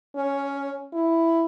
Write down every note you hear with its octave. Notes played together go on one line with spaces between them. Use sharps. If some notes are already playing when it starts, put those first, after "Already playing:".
C#4
E4